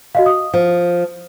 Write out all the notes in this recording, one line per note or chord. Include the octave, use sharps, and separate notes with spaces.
F#4 D#5 F5
D#6
F3